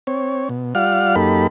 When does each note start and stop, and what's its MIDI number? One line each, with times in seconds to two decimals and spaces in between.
0.07 0.49 60
0.07 0.49 73
0.49 0.74 47
0.75 1.15 55
0.75 1.15 65
0.75 1.15 74
0.75 1.15 77
0.75 1.15 78
0.75 1.15 89
1.16 1.47 42
1.16 1.47 58
1.16 1.47 63
1.16 1.47 67
1.16 1.47 69
1.16 1.47 83